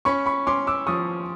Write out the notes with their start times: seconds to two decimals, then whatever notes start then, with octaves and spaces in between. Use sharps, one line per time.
0.05 C#4 B5 C#6
0.26 B5 C#6
0.47 C#4 C6 D6
0.67 D6 E6
0.87 F3 C#6 D#6